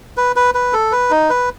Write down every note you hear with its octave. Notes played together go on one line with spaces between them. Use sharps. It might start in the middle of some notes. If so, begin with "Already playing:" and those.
B4
B4
B4
A4
B4
D#4
B4